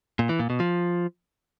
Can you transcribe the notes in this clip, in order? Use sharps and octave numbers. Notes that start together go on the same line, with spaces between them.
A#2
E3
A#2
B2
F3